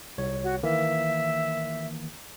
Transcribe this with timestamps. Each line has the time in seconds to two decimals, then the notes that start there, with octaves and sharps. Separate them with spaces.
0.18 C2 C#5
0.43 F#4
0.63 D#3 E3 A#3 E5